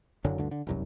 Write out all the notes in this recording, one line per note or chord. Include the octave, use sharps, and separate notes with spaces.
F#1 F#2 D3 F#3
D2 G2 D3
D3
E1 C2 F#2